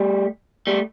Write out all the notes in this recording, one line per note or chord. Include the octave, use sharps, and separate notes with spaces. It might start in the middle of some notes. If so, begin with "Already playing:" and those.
Already playing: G3 A3
G3 A3